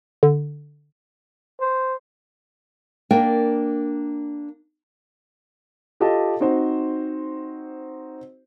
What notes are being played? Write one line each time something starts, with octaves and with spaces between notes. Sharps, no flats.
D3
C5
A#3 D4 A#4 D5 G5
F4 G4 A4 D#5 A5
C4 D#4 F#4 C5